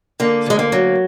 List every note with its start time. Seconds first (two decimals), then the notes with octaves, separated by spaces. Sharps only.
0.20 D3 A#3
0.46 D2 G#3
0.59 A#3
0.72 F#3